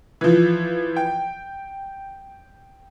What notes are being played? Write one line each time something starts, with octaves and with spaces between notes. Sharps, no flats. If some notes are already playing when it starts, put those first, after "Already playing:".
E3 F3
G5